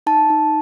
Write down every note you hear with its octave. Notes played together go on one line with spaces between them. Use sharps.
D#4 A5
D#4